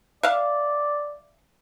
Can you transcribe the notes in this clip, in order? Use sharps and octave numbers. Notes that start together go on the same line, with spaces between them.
D5 E5 F5